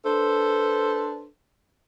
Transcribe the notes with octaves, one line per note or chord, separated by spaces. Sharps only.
D4 A4 B4 C5